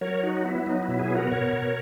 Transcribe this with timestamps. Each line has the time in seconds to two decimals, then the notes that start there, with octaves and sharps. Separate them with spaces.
0.01 F#3 A#4 C#5
0.23 D#4 F#4
0.45 B3 E4
0.66 F#3 D#4
0.83 E4
0.88 B2
0.99 E4 G#4
1.10 B3 F#4 A#4
1.31 B2 A#4 C#5
1.53 B2